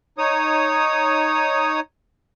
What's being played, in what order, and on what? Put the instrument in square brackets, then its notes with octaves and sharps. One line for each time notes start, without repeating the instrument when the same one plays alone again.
[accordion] D#4 C#5 D#6